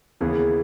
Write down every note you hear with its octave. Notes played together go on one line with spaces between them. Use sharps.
D#2 C#3 E3 B3 G#4